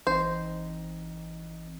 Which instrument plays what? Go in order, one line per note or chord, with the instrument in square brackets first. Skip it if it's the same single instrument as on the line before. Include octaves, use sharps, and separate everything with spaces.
[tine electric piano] G#1 E3 [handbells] C4 D#4 D#5 [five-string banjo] C5